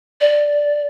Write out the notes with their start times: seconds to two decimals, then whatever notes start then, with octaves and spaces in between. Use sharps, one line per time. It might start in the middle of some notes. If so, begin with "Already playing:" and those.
0.21 D5